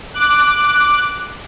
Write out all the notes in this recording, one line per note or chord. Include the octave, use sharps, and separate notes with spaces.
D6 F#6